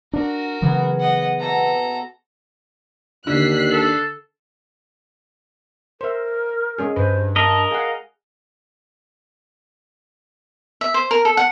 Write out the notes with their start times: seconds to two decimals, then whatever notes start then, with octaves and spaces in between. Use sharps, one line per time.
0.13 D4 F#4 A#4
0.62 C#3 E3 F#3 B3 G#4 B5
1.00 D#5 F#5
1.40 B2 E4 A4 A#5
3.27 D#2 D3 F#6 B6 C7
3.71 A4
6.01 A#4 C5 E5
6.78 G#3 C#4 G#4
6.96 G2 B4 C5
7.36 A#4 D#5 A5
7.71 G#4 F5 F#5
10.81 E5
10.94 C5
11.11 A#4
11.25 A4
11.37 F#5